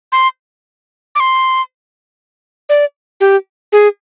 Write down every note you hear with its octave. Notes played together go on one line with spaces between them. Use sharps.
C6
D6
C6
D5
G4
G#4